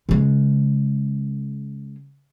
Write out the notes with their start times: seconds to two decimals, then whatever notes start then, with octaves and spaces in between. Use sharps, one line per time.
0.09 C#3 G#3